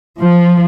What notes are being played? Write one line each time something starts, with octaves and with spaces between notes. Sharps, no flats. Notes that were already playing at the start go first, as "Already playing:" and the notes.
F3